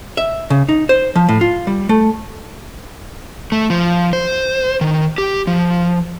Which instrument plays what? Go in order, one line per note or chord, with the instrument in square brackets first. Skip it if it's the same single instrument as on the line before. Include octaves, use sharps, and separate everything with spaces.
[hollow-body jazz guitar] E5
C#3
D#4
C5
F3
A2
F4
G3
A3
[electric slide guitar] A3
F3
C5
D#3
G4
F3